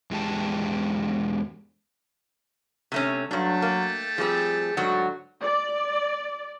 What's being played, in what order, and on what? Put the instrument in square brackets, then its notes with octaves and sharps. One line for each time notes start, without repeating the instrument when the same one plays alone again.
[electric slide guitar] E2 G#3 G4 A5
[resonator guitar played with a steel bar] C3 A3 C#4
[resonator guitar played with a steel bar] G2 D4 [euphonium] F#3 [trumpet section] A3 G5 A5
[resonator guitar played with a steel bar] A#3
[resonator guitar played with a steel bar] F3 G3 C4 [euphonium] G#4
[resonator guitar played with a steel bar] G#2 F#3 F#4 [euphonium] D3
[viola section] D5